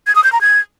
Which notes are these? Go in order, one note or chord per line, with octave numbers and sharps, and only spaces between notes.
G#6
D#6
G6
A#5
G#6